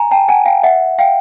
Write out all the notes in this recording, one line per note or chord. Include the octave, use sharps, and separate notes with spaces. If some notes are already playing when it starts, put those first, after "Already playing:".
Already playing: G#5 A#5
G5 A5
F#5 G#5
F5 G5
E5 F#5
F5 G5